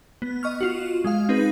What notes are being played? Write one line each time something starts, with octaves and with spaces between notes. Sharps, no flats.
B3
D#5 C#6 F6
F4 F#4
G#3 F5
C4 D#4 G#4 B4